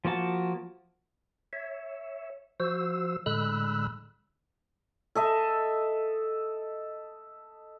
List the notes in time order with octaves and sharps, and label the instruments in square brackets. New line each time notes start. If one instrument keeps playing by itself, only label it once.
[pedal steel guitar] F3 A#3 F#4 A5
[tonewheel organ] C#5 E5
F3 F#4 C5 E6
A2 D3 G#3 B5 E6 F#6
[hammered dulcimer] A4 D#5 E5